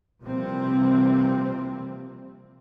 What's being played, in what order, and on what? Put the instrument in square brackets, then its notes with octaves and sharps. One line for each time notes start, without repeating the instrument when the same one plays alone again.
[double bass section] C3 E3 F3 G3 A#3 C4